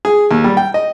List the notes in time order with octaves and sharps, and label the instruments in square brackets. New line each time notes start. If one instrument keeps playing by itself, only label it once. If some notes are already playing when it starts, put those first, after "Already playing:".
[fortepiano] G#4
D#2
G3
G5
D#5